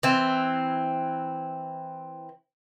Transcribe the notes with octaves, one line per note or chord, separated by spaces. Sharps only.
E3 C4